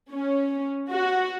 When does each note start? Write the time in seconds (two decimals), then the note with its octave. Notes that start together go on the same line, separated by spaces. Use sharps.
0.11 C#4
0.89 F#4